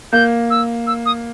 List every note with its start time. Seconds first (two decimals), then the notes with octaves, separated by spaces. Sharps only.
0.12 A#3 G6
0.50 E6
0.87 E6
1.06 D#6